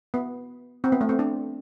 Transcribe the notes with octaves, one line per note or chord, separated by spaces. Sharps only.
B3
C4
B3
A3
C4
D4